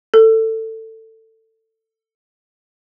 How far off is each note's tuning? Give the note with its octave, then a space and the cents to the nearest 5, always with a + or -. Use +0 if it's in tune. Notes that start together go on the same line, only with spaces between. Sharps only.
A4 +20